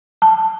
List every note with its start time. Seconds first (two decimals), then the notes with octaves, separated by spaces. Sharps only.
0.22 A5